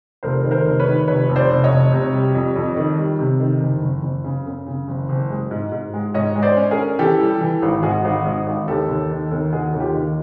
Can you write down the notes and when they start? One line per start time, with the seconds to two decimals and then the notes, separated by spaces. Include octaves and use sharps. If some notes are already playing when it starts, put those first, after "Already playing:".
0.23 F1 A#4 C5
0.44 D#3
0.51 A#4 C5
0.65 F1
0.80 B4 C#5
0.86 D#3
1.08 F1 B4 C#5
1.29 F1
1.36 C5 D5
1.50 F1
1.64 C#5 D#5
1.71 F1
1.92 C3
2.13 G3
2.35 F2
2.56 F2
2.77 D#3
2.98 G3
3.19 C3
3.40 D#3
3.60 F#1
3.82 F#1
4.03 F#1
4.24 C#3
4.46 F#2
4.67 C#3
4.88 F#1
5.09 F#1
5.30 G#3
5.51 G#2
5.72 G#2
5.94 G#3
6.14 G#2 C#5 D#5
6.35 G#3
6.42 C5 D5
6.57 C#4
6.71 G#4 A#4
6.78 C#4
6.99 E3 G4 A4
7.20 G3
7.41 E3
7.62 G#1
7.83 G#2 F#4 G#4
8.05 G#1
8.25 G#2
8.47 G#1
8.68 D#2 G4 A4
8.89 D#2
9.10 D#3
9.31 D#2
9.52 D#3 F#4 G#4
9.74 D#2
9.80 F4 G4
9.94 D#3